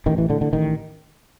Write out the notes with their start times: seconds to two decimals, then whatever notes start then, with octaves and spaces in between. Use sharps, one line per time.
0.06 A1 D#3
0.18 E3
0.29 A2 D3
0.41 D3
0.53 A1 D#3